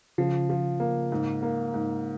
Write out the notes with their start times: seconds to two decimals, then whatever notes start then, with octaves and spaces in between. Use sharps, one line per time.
0.18 C#3 F3
0.50 F3
0.80 A#3
1.12 G#2
1.42 A#3
1.74 G#2